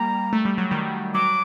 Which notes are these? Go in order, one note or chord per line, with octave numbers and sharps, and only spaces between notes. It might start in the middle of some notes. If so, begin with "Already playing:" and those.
Already playing: G3 A#3 A#5
A3
G3
F#3
D#3 G3
F#3 D6